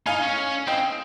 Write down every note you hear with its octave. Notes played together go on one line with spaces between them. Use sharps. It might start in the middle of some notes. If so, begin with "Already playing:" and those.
D#4 F5 G#5
C#4
C4 D#5 G5